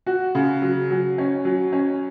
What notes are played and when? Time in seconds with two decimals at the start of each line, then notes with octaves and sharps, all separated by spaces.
0.06 F#4
0.35 C#3
0.62 F#3
0.90 F#3
1.18 C#4
1.45 F#3
1.73 C#4